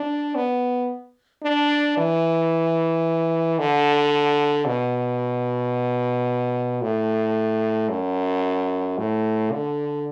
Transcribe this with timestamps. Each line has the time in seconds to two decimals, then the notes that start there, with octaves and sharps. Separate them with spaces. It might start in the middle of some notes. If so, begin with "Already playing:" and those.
Already playing: D4
0.35 B3
1.43 D4
1.97 E3
3.59 D3
4.67 B2
6.82 A2
7.90 F#2
8.98 A2
9.52 D3